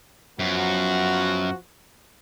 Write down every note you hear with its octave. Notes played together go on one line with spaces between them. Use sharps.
F#2 F3 B3 F#4